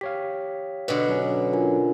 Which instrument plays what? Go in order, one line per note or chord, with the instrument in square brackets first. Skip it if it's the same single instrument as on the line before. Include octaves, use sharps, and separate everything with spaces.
[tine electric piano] G4 C#5 F5 [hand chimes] B6
[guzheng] B2 D3 [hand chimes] B4
[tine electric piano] F#3 C#4 [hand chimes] D4
[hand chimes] F4 A#4 G#5